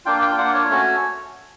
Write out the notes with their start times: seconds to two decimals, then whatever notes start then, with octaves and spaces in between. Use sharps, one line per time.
0.05 A#3 D4 F4 G5
0.22 G5
0.38 A#3 D4 F4 F#5
0.54 C#5
0.70 A3 C#4 F#4